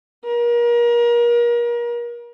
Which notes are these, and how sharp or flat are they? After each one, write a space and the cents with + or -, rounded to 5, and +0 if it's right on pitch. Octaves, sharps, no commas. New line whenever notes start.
A#4 +35